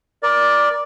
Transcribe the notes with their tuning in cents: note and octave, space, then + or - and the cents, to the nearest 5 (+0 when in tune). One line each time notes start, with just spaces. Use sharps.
A#4 +25 D5 +0